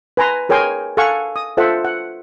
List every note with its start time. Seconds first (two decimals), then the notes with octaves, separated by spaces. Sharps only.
0.17 B4 G#5 A#5 C6
0.49 G#4 A#4 C#5 G5 G#5 C6
0.97 A4 F5 F#5 G#5 C#6
1.36 D#6
1.57 F4 A4 C5 E5 F#5
1.85 F#5